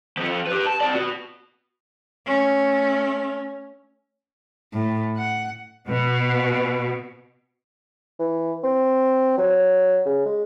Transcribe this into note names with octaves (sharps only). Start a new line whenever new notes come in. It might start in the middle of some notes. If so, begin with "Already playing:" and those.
F3 A4
G4 B4
A5
C4 D5
B3 F#4
A3 C#4
A2
F#5
B2
E3
C4
F#3
C#3
G#3